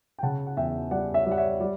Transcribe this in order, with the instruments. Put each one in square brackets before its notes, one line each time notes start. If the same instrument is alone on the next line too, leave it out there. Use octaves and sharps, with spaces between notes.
[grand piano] G5
C#3 F#5 A5
F#5
E2 E5 G5
G3 D5 F#5
C#5 E5
G3
F#5
C#5 E5
G3 D5